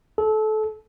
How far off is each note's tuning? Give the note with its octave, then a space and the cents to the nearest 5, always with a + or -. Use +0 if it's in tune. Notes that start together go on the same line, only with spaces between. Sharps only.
A4 -25